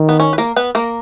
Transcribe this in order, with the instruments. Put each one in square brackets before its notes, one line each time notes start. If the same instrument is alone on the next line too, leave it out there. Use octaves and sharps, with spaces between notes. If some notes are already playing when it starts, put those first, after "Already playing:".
Already playing: [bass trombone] D#3
[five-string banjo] B3
C#4
B4
A#3 A#4
B3 B4
A#3 A#4